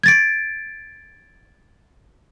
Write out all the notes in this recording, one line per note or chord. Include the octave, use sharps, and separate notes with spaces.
G#6 A6 D7